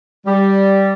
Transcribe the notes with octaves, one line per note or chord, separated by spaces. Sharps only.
G3